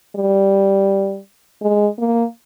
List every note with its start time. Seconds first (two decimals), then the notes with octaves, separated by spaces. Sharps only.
0.16 G3
1.62 G#3
1.99 A#3